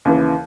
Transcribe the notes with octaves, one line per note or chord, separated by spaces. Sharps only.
D#2 C#3 E3